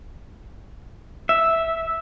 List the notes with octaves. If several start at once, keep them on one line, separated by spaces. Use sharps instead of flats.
E5